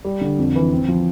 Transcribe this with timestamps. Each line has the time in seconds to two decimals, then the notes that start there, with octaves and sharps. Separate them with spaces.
0.05 G3
0.21 D3
0.39 F2
0.56 E3
0.72 C4
0.88 F3